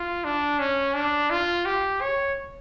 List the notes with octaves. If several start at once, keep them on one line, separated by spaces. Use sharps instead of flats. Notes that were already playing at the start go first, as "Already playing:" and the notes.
Already playing: F4
D4
C#4
D4
F4
G4
C#5